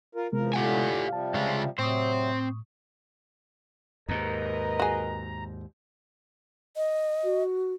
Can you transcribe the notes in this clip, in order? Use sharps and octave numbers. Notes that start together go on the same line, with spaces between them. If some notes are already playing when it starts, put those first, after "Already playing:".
F4 A#4
E2 C3 F3 G#3 B3 A#4
A2 D3 F4 G4 F#5 G#5
C3 F3 G3 F5 A5
C#3 G#3 F4
A2 C3 F#3 C4 C5 C#6 D#6
D#2 G#2 A#4 B4 D#5 A#5
F#4 G#4
D#5
F#4